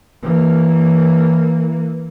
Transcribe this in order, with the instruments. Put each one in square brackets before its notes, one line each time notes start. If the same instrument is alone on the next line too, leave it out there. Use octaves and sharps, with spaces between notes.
[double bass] E3 A#3